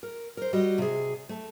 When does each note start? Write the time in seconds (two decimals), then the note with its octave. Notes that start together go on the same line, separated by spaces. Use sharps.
0.03 A#4
0.37 A#4 C5
0.53 G3 F#4 D#5
0.78 C3 G#4
1.29 A3